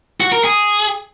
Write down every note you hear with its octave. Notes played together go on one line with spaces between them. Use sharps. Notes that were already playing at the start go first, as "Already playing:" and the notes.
F#4
A#4
G#4